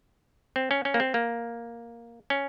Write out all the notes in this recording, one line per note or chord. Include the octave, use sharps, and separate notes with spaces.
C4
C#4
C#4
A#3
C4
A#3
C#4